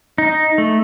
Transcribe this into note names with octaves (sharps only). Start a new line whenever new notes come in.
D#4
A3